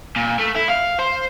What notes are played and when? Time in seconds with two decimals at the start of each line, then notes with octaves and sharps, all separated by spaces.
0.16 A#2
0.40 A3
0.56 E4
0.70 F5
0.99 C5